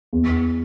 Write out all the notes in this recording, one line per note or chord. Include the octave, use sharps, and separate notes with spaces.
E2